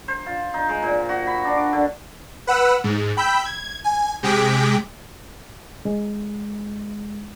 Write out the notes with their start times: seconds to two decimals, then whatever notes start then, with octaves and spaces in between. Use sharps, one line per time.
0.08 C5
0.26 F4
0.54 D#4
0.69 G#3
0.83 A#2
1.09 F#4
1.27 B5
1.44 D4
1.57 D6
1.73 D3
2.47 B4 F#5 E6
2.84 G#2
3.17 G5 B5 E6 G6 B6
3.45 G#6
3.84 G#5
4.23 C3 G#3 G5 D6 B6 D7
5.85 G#3